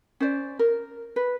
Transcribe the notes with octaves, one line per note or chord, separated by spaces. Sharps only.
C#4 C5 D5
A#4
B4